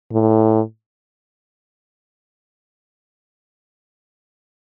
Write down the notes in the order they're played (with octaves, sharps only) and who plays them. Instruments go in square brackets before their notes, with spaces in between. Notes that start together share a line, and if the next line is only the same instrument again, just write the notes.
[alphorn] A2